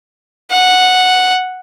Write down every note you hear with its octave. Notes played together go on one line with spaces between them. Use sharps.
F#5